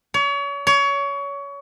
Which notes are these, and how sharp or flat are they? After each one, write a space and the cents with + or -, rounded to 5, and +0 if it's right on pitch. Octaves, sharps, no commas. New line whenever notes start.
C#5 +35
C#5 +25